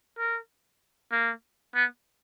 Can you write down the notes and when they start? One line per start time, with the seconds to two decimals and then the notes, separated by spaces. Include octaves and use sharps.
0.18 A#4
1.12 A#3
1.75 B3